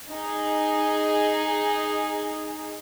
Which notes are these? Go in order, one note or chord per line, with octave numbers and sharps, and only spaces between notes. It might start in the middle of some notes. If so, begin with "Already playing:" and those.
D#4 G#4